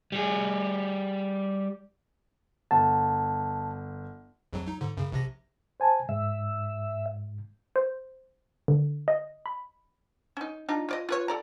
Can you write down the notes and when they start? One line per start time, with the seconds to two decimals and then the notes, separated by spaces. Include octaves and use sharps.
0.12 G3 G#4
2.71 G1 F#5 A5
4.53 A#1 F2 F#3
4.67 F#3 D#4
4.81 G#2 D3
4.97 F#2 C#3
5.12 A#1 C3 A#6
5.80 C5 G#5 A5
6.09 G#2 E5
7.76 C5
8.68 D3
9.08 D#5
9.46 B5
10.37 C#4 D#4
10.69 D4 D#4 F4
10.89 F4 D5 D#5
11.09 F4 B4 C#5
11.28 A4 D5 A#5